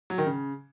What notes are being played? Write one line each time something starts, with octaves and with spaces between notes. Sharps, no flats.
F#3
D#3
C#3